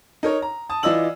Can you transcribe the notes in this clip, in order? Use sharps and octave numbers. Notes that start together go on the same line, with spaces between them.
D#4 A#4 C#5
A#5
A5 D#6
E3 F4 D5 D#5 E6 F#7